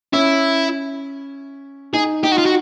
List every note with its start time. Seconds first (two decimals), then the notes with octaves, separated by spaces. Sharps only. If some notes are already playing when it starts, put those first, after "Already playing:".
0.13 C#4 E4
1.94 D#4 G#4
2.24 D#4 G4
2.32 F#4
2.38 F4
2.46 F#4